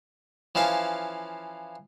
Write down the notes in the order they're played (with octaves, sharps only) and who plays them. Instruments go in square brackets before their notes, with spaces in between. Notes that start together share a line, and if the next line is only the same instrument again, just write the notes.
[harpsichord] E3 F3 C#4 F5 A5